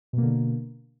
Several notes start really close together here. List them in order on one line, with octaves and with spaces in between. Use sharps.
B2 A#3 D3